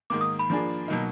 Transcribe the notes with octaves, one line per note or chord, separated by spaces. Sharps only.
G#2 D#3 A#3 D6
D#6
B5
F3 A#3 D4 G#4
B2 F#3 A#3 D#4